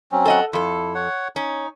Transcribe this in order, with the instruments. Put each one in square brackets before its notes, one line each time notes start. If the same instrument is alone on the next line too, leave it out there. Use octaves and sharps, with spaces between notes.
[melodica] F#3 C4 C#4
[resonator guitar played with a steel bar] A4 D#5 F#5
[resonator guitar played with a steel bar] F2 A4 [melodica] E4
[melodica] C#5 F#5
[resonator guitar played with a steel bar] C#4 [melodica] D#4